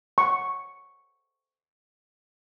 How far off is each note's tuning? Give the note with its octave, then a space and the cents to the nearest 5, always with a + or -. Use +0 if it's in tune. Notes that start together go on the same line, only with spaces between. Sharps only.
C#6 -5